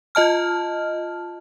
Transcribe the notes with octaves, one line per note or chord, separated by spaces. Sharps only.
F4 D#5 A5 F6